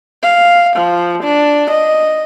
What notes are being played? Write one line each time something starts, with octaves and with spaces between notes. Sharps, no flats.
F5
F3
D4
D#5